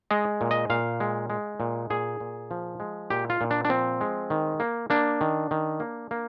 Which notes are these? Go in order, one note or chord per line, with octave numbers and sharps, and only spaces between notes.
G#3 D#5
A#2
D#5
A#2 F5
G#3
G#3
A#2
A#2 G#4
A#2
F3
G#3
A#2 G4
F4
A#2
D4
D4
F3 C4
G#3
D#3
A#3
A#3 D4
D#3
D#3
A#3
A#3